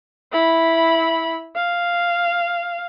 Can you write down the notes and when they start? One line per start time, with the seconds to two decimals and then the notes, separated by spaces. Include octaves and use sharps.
0.32 E4 B5
1.55 F5